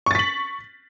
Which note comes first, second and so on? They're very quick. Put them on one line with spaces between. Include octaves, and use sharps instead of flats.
C#6 A6 B6 F#7